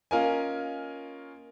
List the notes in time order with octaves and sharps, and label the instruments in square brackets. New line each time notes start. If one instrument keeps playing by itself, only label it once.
[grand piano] A#3 C#4 F4 A#4 D#5 G#5